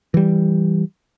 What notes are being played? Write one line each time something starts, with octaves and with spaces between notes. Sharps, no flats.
E3 G3